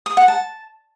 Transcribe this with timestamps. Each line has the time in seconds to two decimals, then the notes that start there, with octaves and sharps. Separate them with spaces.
0.06 D#6
0.17 F#5
0.28 A5